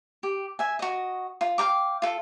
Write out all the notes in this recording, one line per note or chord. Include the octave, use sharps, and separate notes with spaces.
G4
E5 G#5
F#4 D#5
F4
F5 G5 A#5 D6
F4 A4